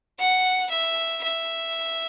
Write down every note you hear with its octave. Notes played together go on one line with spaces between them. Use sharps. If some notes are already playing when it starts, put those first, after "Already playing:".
F#5
E5
E5